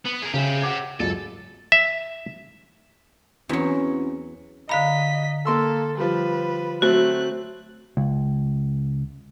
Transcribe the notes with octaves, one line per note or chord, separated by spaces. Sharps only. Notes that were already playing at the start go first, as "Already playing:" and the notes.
B3
G#4 A#4
C#3 G4 E5
F#5 D6 G#6
C#2 F#2 A4
E5
E2 F#3 C4 C#4 E4 F#4
D3 D#5 F5 A#5 B5 B6
A#3 A4 C6 E6
F3 G3 B4
F#3 A3 C4 F#4 F#6
C#2